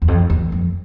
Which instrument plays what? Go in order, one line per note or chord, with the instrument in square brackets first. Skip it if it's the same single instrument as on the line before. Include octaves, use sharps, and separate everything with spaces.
[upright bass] E2
F2
E2
F2